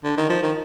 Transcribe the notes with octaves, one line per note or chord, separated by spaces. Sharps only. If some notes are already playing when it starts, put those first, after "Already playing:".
D3
D#3
F3
D#3